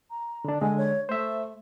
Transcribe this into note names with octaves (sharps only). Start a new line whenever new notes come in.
A#5
D3 D4
D3 G#3 G#5
C#5
A3 C5 E5